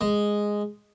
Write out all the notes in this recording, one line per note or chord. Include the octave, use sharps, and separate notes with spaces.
G#3